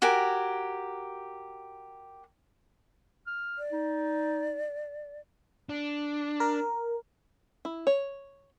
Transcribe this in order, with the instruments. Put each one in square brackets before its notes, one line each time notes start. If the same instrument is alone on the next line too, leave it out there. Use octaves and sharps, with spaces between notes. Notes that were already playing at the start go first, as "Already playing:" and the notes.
[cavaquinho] F#4 G4 A#4 G#5
[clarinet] F6
[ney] D5
[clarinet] D#4
[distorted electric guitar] D4
[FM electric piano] A#4
[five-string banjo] E4
C#5